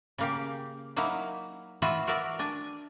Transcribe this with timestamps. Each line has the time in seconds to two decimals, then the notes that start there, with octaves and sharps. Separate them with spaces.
0.18 C#3 A#3 G4
0.96 F#3 A#3 D#4 E4
1.82 E3 F4 F#4 B4 E5
2.07 F#4 A#4 D5 E5
2.39 D4 G#5